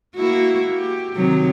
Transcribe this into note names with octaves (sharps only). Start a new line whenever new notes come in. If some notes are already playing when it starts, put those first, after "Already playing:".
A#3 E4 F#4
G4
C3 D#3 F#3